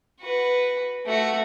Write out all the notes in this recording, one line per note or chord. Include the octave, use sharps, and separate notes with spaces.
F#4 B4
A3 F#4